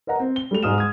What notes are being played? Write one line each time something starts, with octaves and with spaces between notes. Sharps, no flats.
A#4 B4 D#5 F#5 A#5
C4
G7
G3 A3 F7
G#2 G#4 D#6 F6 E7
D#6 G#6